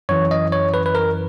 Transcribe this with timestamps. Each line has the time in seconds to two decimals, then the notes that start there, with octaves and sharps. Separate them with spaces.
0.09 F#2 E3 C#5
0.31 D#5
0.52 C#5
0.74 B4
0.86 B4
0.95 A#4